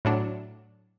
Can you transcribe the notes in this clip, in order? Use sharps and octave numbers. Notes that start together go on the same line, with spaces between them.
A2 F#3 D4